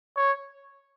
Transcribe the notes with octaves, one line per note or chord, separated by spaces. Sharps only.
C#5